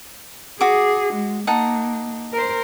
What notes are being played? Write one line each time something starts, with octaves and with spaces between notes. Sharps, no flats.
F#4 G#4 D6
G#3
A#3 D#4 F#5 A5
A#4 C5